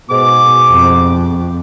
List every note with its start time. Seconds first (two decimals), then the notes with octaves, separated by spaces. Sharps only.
0.10 G#2 B2 D6
0.72 F2